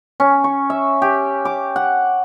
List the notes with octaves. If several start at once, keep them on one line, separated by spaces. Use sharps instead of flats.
C#4
C#6
E5
G4
D6
F#5